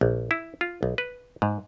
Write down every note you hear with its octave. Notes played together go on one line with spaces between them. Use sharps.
A#1
E4
F4
B1
B4
G#2